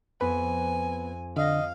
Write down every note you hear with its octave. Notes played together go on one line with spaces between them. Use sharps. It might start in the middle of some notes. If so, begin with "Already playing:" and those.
F2 B3 B4 G#5
D3 D#5 F5